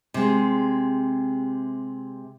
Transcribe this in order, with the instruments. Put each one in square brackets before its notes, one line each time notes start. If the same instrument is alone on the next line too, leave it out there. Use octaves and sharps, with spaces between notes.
[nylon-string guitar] C3 G#3